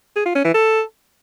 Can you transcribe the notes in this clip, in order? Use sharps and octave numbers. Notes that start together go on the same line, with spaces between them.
G#4
F4
C#4
E3
A4